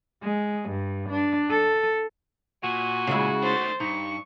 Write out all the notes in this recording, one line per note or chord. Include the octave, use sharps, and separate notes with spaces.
G#3
G2
D4
A4
A#2 F#4 G#5
C#3 G#3 E4
D#3 A3 C5 A6
G2 D#4 C#6